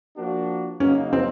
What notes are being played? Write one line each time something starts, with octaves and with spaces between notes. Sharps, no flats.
F3 A#3 D4 F#4
C#3 F#3 A#3 C#4 D#4
C4